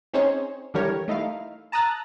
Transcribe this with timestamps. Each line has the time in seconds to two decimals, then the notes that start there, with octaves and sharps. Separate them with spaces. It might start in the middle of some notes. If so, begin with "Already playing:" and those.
0.13 C4 C#4 D#4 G#4 C5 C#5
0.74 D3 E3 G3 G4 A#4 C#5
1.08 A3 D#4 E4 F5
1.72 A5 A#5 D#6 E6 F#6 A6